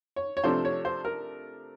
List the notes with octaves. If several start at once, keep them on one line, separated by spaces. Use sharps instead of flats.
C#5
C#5
C3 F3 A3 D4 C5
C#5
C5
A#4